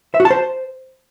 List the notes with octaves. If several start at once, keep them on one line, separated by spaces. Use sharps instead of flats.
E5
F#4
A5
C5